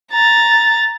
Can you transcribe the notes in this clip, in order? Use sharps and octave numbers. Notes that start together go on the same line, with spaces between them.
A#5 A6